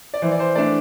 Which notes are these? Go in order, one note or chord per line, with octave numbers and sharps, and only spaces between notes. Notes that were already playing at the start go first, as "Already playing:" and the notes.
D5
E3 C5
D5
C5
A3 D4 D5